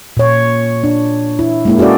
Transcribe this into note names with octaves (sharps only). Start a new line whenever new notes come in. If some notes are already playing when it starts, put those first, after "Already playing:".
A#2 C#5
D4
E4
G#3 A#3 E4
C#4 F#4 G#4 A4 D5